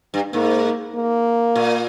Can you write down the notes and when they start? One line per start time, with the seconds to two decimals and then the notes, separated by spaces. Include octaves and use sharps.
0.14 G2
0.33 G#2 A#3
0.95 A#3
1.56 A#2